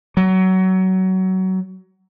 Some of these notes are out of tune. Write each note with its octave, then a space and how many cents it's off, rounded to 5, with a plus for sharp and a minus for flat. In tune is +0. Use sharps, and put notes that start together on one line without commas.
F#3 +20